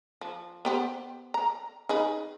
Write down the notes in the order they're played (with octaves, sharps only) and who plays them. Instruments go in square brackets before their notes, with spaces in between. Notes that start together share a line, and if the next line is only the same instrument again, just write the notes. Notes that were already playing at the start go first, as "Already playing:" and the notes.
[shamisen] F3
B3 G4 C5
A#5
D#4 G#4 B4